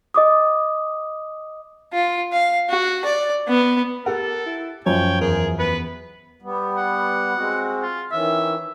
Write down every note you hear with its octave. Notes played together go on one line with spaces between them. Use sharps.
D#5 D6 D#6
F4
F5
F#4
D5
B3
G4 A4 A#4 F#5
E4
F#2 F3 C#5 G5
E2 G#4 A#4
B3 B4
G3 B3
F#5
G#3 C4 F#4
F4
D#3 E3 C#4 E5